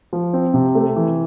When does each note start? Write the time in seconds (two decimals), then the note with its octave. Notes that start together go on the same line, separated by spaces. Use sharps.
0.13 F3
0.33 C4
0.54 C3
0.75 A3
0.96 E3